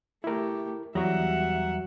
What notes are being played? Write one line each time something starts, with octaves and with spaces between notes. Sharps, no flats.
A3 E4 G4 A#4
E2 F#3 G3 F#4 E5 F#5 A#5